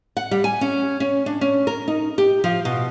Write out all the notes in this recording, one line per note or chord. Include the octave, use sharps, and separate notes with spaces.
F#5
G3
G#5
C#4
C#4
D4
C#4
A#4
D#4
G4
F3
B2